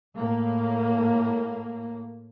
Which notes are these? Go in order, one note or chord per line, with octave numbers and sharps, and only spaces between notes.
A2 A#3